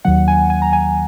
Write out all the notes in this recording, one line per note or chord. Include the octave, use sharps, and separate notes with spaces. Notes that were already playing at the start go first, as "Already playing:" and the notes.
D#2 D#3 F#3 F#5
G#5
G#5
A#5
G#5